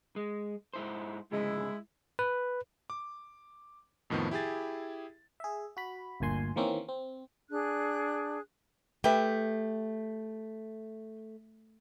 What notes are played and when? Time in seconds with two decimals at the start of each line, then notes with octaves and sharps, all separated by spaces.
0.16 G#3
0.74 G#2 E4 C5
1.32 D2 G#2 C#3 G#3 E4
2.19 B4
2.90 D6
4.10 F2 A2 D#3 F3 B3
4.31 E4 G4 G#4 A6
5.40 G#4 E5
5.77 F#4 B5
6.20 G1 D2 A#2 G#5 C6
6.56 D#3 E3 A#3 C4 C#4
6.89 C4
7.50 D4 G#4 F#6
9.04 A3 G4 B4 E5 G5